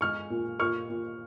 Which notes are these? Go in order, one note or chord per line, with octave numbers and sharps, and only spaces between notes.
G#3 C#6 F6
A#2
A#2 C#6 F6
A#2